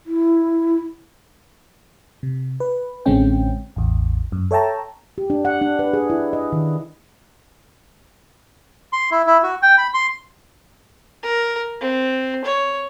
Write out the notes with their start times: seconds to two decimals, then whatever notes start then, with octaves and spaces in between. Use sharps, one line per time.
0.06 E4
2.23 C3
2.60 B4
3.06 A1 D3 G#3 C4 C#4 G5
3.76 A1 E2
4.32 F#2
4.51 A4 C#5 E5 G5 A5 A#5
5.18 G4
5.30 D4
5.45 F#5
5.62 D4
5.79 B4
5.93 G#4
6.10 E4
6.33 D#5
6.53 D#3
8.93 C6
9.11 E4
9.27 E4
9.43 F#4
9.62 G5
9.78 B5
9.94 C6
11.23 A#4
11.81 C4
12.45 C#5